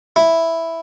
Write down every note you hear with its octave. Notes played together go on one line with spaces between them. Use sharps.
E4